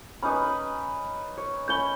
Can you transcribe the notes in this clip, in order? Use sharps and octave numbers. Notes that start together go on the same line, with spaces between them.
C#4 D#4 B4 B5 D#6
B4
C#5
C#4 C#5 B5 G6 G7